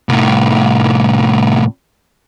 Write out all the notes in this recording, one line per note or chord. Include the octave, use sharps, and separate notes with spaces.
C2 A2